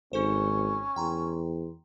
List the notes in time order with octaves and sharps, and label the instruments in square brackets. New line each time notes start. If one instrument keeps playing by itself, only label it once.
[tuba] G#1 [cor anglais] C#4 [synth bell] D#4 A4 C5
[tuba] E2 [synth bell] G5 A#5 C6